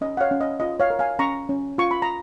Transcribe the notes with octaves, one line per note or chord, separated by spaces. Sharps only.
C#4 D#5
F#5
C#5 F5
C#4
D#5
F4 D#5
C#5 F5
A#4
F5 G#5
C#4 A#5 C#6
C#4
F4 C#6
B5
A#5